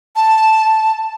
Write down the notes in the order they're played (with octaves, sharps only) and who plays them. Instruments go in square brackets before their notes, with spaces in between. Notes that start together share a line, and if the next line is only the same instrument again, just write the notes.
[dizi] A5